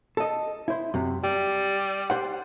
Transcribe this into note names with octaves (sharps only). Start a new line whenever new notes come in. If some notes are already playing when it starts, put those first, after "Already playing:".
A4 D#5
E4 C5
F#2 C3
G3 G4
G4 C5 F#5